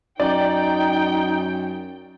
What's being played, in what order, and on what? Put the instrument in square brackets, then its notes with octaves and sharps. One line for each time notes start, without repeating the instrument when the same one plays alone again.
[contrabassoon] F#2 [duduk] D#4 [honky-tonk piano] D5 [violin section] G5